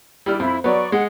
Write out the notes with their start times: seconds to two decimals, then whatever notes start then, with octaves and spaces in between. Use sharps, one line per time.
0.26 G3 E4 D5 F6
0.40 F2 E4 B5
0.64 F#3 B3 D5 C#6
0.92 G#3 F#5